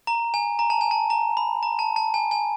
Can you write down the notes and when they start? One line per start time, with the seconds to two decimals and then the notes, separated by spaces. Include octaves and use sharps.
0.07 A#5
0.34 G#5
0.59 A#5
0.70 A5
0.81 G#5
0.91 A5
1.10 A#5
1.37 B5
1.63 A#5
1.79 A5
1.96 A5
2.14 G#5
2.31 G#5